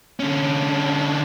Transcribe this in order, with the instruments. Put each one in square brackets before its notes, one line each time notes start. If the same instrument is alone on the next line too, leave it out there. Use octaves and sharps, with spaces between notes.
[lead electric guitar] D3 C#4